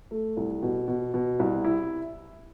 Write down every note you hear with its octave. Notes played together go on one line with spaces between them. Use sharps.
A3
C2
B2
B2
B2
C2
E4